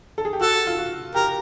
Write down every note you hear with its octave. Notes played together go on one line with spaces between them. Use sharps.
A4
G#4
G4
F#4 A4
F4
F#4
G4 A#4